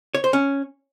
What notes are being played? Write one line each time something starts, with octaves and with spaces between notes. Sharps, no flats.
C#5
C5
C#4